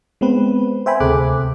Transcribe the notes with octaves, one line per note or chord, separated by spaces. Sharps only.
G#3 B3 C4 B4
C5 E5 G5 G#5 B5
D2 C3 G#4 A4 D6 F#6